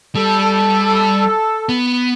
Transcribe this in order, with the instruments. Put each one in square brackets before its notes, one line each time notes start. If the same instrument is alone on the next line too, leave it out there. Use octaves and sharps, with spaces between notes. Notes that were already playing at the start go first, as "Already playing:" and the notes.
[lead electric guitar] G3 [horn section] A4
[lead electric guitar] B3